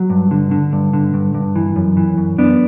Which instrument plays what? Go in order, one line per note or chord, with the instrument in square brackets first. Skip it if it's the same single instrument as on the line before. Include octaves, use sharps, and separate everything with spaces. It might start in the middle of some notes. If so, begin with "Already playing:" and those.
Already playing: [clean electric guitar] F#3
G2
D3
D3
G2
D3
G2
G2
E3
F#2
E3
F#2
F#2 B3 D4